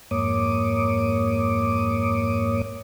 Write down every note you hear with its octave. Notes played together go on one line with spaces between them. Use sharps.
F2 G#2 A#3 C#5 D6 D#6